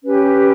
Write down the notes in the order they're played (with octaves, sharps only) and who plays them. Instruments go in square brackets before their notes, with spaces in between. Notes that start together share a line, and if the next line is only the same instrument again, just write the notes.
[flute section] C#4 G4 B4